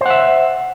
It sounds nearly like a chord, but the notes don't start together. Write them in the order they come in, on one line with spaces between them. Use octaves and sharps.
C5 F#5 E5